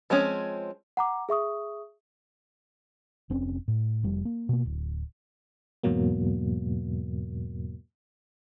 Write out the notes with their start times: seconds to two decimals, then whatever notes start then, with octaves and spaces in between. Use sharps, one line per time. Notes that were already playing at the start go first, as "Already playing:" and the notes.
0.10 F3 G#3 C4 C#4
0.97 F#5 A#5 D6
1.29 G#4 E5 C#6 D#6
3.30 F1 C4 C#4
3.68 A2
4.03 F1 F2 G3
4.25 A#3
4.49 B2 A#3
4.65 D1
5.83 E2 G#2 B2 F#3 A#3